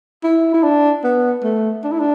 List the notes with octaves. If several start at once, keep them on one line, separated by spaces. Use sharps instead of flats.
E4
E4
D4
B3
A3
D4
E4
D4